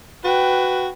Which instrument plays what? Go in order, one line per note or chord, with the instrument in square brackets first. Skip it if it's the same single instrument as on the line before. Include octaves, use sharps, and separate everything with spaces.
[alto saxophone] F#4 [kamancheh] B4 G5